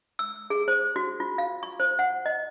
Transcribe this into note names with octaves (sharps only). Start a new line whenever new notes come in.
E6
G#4
C5
F#4
F4
F5
C#6
C5
F#5
D#5